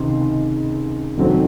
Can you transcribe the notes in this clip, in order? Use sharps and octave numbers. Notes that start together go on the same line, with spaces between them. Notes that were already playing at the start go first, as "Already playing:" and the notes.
Already playing: C#2 C3 D#3 C6
F1 F2 D#3 F#3 C4